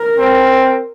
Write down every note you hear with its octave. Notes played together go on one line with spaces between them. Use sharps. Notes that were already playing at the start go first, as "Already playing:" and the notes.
Already playing: A#4
C4